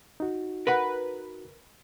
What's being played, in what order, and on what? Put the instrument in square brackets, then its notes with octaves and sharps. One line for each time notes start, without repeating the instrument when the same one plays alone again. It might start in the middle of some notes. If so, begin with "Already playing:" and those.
[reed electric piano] D#4 F#4
[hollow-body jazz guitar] A#4 F#5 B5 [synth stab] B4